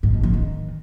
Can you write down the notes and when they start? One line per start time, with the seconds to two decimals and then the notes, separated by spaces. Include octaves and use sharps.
0.03 G#2
0.13 B2
0.23 E3
0.34 D#3